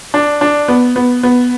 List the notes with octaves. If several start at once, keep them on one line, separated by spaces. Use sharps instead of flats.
D4
D4
B3
B3
B3